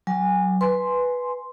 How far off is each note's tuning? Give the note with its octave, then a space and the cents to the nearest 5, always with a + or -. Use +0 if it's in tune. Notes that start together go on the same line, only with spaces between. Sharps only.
F#3 +20 G#5 -15
B4 +0 G#5 +10 C6 +0